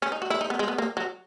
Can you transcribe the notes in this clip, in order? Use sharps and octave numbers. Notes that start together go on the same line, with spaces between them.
C#4
D#4
F#4
E4
D#4
B3
G#3
B3
A#3
F#3